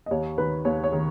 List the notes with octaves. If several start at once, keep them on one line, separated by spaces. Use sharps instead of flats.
D#5
D#2 C#5
D#3 B4
D#2 C#5
C#5
D#3